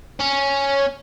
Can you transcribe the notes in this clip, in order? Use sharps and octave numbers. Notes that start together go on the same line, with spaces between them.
C#4